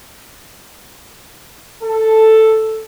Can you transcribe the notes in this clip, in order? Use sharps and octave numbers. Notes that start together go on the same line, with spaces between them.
A4